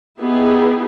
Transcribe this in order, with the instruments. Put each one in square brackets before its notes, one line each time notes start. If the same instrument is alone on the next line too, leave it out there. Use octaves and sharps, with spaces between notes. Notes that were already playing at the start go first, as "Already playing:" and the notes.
[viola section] B3 D#4 E4 G4 G#4